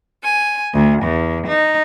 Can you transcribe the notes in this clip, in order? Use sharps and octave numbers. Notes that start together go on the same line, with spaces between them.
G#5
D2
E2
D#4